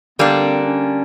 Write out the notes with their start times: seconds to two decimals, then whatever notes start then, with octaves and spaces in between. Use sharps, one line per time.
0.19 D3 G3 A#3 B3 D4
0.42 C4
0.65 C#4